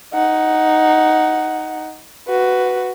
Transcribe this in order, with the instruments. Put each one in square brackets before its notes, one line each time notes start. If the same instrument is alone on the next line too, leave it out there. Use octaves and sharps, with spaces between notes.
[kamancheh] D#4 F#5
F#4 B4